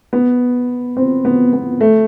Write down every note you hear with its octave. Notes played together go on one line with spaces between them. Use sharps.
B3
C4
B3
B3
A3